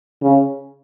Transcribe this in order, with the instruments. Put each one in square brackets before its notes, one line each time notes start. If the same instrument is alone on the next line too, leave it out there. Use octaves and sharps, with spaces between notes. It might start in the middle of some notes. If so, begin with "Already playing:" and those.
[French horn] C#3